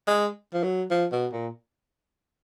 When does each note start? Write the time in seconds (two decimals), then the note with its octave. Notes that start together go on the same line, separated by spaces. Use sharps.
0.07 G#3
0.53 F3
0.63 F#3
0.90 F3
1.12 B2
1.32 A#2